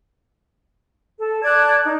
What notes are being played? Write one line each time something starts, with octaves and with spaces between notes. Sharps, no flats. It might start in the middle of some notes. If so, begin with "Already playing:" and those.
A4
D5 A5 F#6 G#6
D#4